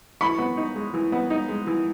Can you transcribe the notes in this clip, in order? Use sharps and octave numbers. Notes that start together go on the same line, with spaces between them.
E3 B5 C#6
B3
D#4
G#3
E3
B3
D#4
G#3
E3